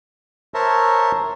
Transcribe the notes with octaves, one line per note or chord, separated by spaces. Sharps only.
A#4 C5 C#5 E5 A5 A#5